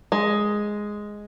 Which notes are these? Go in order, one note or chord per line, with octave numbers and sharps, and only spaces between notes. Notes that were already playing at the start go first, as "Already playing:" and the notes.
G#3